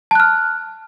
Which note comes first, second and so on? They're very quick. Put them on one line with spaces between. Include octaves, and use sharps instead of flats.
A5 F#6 F6